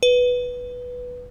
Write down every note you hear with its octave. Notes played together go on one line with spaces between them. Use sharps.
B4